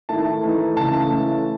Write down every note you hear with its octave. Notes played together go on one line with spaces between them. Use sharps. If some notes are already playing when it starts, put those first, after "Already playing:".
D#3 A3 E4 A5
E3 A3 D#4
C#3 E3 A3 A5
E3 A3 C#4 E4